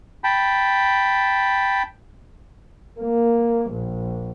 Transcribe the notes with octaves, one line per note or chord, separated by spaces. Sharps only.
G5 A5 B5
A#3
A#1